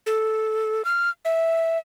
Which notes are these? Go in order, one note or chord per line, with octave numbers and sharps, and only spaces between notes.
A4
F6
E5